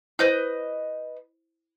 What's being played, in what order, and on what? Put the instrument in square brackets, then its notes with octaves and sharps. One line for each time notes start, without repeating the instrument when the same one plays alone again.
[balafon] E4 C5 [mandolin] B4 D#5 G6